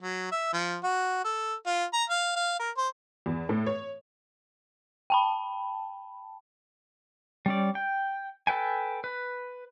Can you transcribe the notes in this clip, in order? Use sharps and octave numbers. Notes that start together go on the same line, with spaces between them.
F#3
E5
F3
F#4
A4
F4
A#5
F5
F5
A#4
C5
E2
A2
C#5
G5 A5 B5
G3 C#4 D5
G5
A4 B4 G5 G#5
B4